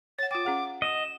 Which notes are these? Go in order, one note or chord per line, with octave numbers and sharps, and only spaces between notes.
C#5 F#5 A6
F4 G5 D6 A6
C#4 G#4 F5 F#5
D#5 E7